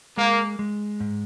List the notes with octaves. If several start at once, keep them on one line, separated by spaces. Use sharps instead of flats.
G#3 A#3
G#3
G#2